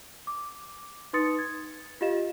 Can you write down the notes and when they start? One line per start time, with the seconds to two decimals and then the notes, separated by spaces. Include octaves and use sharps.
0.27 D6
1.13 D#4 B4 C6 D#6 A6 C#7
1.39 G#6
2.01 F4 G4 D#5 F5 E7